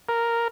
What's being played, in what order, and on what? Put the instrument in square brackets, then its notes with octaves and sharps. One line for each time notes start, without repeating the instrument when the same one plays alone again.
[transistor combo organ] A#4